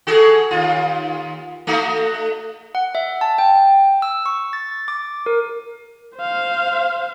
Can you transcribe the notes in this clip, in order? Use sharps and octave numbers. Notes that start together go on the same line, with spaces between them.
F#4 G#4 A4
D#2 F4
A3 D#4 F#4
F#5
E5
A5
G5
E6
C#6
A6
D6
A#4
C5 F5